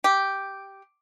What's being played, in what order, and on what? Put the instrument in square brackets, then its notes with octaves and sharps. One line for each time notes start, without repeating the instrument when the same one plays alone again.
[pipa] G4